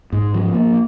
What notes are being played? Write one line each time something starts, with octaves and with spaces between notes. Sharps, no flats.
G#2
F3
A#3